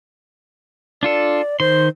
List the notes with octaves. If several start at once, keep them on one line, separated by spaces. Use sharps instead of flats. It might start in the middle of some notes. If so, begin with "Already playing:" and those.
D4 F4 A4 D5
D#3 C5 C6